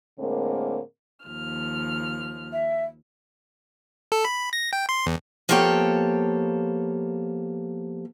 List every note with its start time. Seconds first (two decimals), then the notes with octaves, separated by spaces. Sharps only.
0.19 A2 D3 G#3 A#3 C4 A#4
1.25 D#2 F3 F6
2.53 E5
4.12 A4
4.25 B5
4.53 A#6
4.73 G5
4.89 C6
5.06 E2
5.49 F3 A#3 B3 G4 A4 C#5